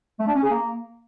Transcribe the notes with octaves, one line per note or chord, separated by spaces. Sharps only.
A3
D4
C#4
G#4
A#3